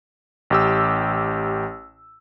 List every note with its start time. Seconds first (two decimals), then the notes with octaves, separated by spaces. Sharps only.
0.50 A1 G4 E6